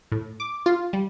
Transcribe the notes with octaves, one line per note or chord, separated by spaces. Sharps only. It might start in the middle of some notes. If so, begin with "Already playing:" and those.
A2
D6
F4
G3